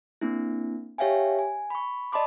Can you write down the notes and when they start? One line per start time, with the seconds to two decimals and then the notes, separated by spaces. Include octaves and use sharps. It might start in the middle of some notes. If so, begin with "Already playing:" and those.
0.21 A#3 C4 D4 E4
0.98 G4 C#5 E5 F5 G5 G#5
1.39 G#5
1.70 B5 C#6
2.12 D5 D#5 A5 B5 C6 D6